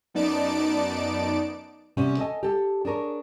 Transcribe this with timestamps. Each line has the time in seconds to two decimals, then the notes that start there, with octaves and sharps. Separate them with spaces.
0.14 F#2 B3 D#4 D5 A5 D7
1.97 C3 G3 B3 C#4
2.19 A4 D#5 G#5
2.43 G4 A4
2.85 D4 G#4 A#4 C#5